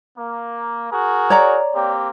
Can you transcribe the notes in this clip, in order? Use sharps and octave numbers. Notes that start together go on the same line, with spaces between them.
A#3
F#4 G#4 A#4
C#5 D5 A#5
A#3 C4 G4